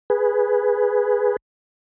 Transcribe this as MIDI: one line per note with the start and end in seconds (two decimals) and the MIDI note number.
0.10 1.37 68
0.10 1.37 71